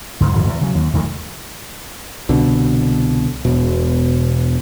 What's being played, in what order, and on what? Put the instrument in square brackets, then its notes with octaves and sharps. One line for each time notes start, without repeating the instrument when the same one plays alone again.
[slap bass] C#2 G#2
D1 G#1 F2
E2
C#3 F#3
D#2
F1 D2 D#3 A3
[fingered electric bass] C2 B2 D3
E1 B2